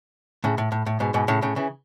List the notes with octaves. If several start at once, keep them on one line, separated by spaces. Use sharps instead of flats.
A2 C#3
A2
A2
A2
G#2 B2
G#2 B2
A2 C#3
A2 C#3
C#3 E3